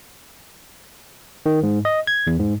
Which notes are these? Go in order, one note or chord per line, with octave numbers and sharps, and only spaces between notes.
D#3
G#2
D#5
G#6
E2
G#2